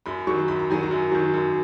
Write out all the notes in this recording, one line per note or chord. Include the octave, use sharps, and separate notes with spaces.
F#2 B5
D#3 F#3 C#6
F#2 B5
A#5
D#3 F#3 G#5
A#5
F#2
D#3 F#3
F#2